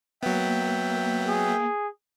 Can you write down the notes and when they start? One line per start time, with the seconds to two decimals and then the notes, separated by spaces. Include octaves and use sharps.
0.23 F#3 A#3 B3 E5 G5
1.28 G#4